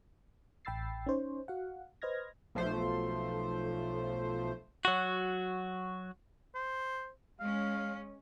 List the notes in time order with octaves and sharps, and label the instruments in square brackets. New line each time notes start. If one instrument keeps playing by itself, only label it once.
[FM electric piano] A1 G5 B5 E6 A6 C7
C#4 D#4 C5 C#5
F#4 F5 F#5
B4 C5 D#5 F6 G#6 A#6
[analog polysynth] B1 F3 A3 C5
[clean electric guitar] F#3 F#4
[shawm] C5
[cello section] G#3 C#4 [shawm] F5